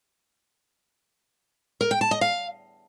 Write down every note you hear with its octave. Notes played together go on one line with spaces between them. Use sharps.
A#4
G5
A5
D#5
F5